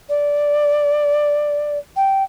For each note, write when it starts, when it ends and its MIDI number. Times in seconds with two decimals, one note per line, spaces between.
0.09 1.78 74
1.96 2.23 79